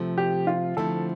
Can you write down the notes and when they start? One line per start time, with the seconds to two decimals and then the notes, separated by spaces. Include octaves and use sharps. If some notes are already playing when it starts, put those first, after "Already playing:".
Already playing: C3 F3 A3
0.18 G4
0.47 F4
0.77 D3 F3 A3 C4 E4 A4